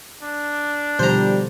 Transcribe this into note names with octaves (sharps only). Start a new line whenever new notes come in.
D4
B2 D3 F3 G3 C5 A#5